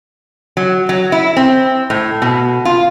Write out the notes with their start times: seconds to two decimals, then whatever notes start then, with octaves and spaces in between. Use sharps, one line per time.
0.57 F#3
0.89 F#3
1.12 E4
1.36 C4
1.90 A2
2.22 B2
2.65 F4